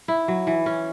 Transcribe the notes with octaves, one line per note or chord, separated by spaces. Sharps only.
E4
F#3
E3
C#4